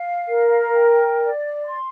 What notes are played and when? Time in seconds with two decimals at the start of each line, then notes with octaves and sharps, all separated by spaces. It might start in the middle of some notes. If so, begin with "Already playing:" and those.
Already playing: F5
0.28 A#4
0.74 G5
1.20 D5
1.65 C6